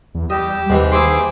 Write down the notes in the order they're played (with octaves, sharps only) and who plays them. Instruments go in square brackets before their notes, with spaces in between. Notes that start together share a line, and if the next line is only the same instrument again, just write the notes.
[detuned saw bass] E2
[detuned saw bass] G3 [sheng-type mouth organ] G4 E6 [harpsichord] D#5
[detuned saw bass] D#2 [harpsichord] G#2 C3 E3
[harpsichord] E4 C5 C6 [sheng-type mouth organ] G#4 D6